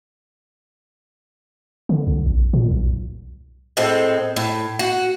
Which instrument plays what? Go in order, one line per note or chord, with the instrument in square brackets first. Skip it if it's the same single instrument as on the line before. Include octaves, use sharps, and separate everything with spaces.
[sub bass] D3
C2
A#1
A#2
B1
[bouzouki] A2 G#3 C4 A4
A2
F#4